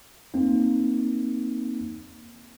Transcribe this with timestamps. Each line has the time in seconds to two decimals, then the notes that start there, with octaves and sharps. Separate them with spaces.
0.34 A#3 C4 D#4